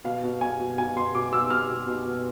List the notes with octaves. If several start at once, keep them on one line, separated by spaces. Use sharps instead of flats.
B2 F5
B2
B2 G#5
B2
B2 G#5
B2 C6
B2 D6
B2 E6
B2 F6
B2
B2
B2